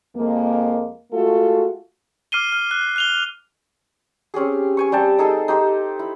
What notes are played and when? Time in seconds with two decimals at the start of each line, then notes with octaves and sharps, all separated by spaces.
0.16 F2 G#3 A#3
1.12 G#3 A3 F4 F#4 A4
2.32 D6 F6 C7 D#7 G7
2.52 F6
2.71 F#6
2.96 F#6 F7 G7
4.34 C4 C#4 G4 G#4
4.77 C#5 G#5 C#6
4.92 G3 C4 G5 A5
5.18 D#4 G#4 A4 E6
5.48 D#4 G4 C5
5.99 E4